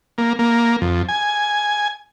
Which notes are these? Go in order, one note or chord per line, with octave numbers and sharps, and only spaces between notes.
A#3
A#3
F2
G#5